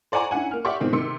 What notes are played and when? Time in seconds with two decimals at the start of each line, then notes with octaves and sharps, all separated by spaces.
0.12 C5 D5 F#5 G#5 A#5 C#6
0.31 C#4 D4 E4 F#5 G#5
0.51 A#3 F6
0.65 G4 D5 E5 F#5 C6 C#6
0.80 G#2 B2 D#3 C4 D#4
0.93 C3 D#3 C6 E6 C#7